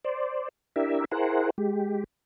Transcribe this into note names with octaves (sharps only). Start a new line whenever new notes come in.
C5 D5
D4 E4 G4 A#4 E5
E4 G#4 A#4 C5 F#5
G#3 G4